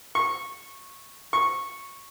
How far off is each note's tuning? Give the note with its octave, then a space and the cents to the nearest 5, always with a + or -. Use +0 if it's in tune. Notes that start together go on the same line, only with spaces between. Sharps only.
C#6 -15
C#6 -10